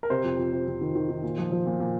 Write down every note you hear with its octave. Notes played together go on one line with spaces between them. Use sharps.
A#4
C3 C5
F2
F2
C3
F2
D#3
D#3
D#3
A#2
F3
F3
A#2
A#2